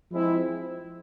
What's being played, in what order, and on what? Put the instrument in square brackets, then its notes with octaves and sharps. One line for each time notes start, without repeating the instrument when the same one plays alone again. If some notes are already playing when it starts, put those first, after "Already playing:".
[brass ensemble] F3 G#3 C4 E4